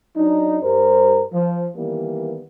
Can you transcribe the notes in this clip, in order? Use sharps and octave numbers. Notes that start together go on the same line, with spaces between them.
F#3 D4 D#4
G2 G3 A#4 C5
F3
D#3 E3 G3 A#3 B3